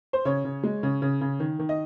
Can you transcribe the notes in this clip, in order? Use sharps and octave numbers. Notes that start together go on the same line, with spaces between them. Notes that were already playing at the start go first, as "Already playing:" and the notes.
C5
C#3 C#5
C#3
G#3
C#3
C#3
C#3
D#3
D#3
D#5